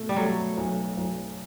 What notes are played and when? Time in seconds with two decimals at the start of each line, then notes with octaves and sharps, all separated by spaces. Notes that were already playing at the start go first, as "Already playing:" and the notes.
Already playing: B2 A3
0.09 G3
0.16 F#3 A3
0.57 B1
0.97 B1